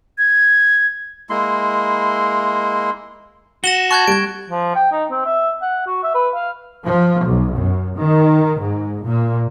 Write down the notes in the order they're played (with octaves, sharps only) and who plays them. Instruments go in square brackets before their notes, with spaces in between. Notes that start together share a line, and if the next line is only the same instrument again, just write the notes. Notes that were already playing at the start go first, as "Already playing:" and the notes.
[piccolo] G#6
[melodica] G#3 A#3 E4 C6
[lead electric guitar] F#4 [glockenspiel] A#6 E7 G7
[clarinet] A5 [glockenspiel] C#6 F#6 G#6
[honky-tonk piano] G3 [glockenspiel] G#6 D7
[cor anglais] F3
G5
D#4
C4
E5
F#5
F#4
E5
B4
F5
[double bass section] F3
B1
F#2
D#3
G#2
A#2